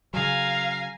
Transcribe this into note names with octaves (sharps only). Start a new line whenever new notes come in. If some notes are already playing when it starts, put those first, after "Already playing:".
C#3 F#3 F5 G#5 A#5